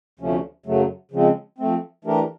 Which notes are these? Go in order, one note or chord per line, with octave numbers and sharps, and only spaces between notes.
D2 C3 F3 A3 C#4
F#2 C#3 F#3 A3
C#3 F3 G#3 C4
F3 A3 C4
E3 A3 D4 G4 A#4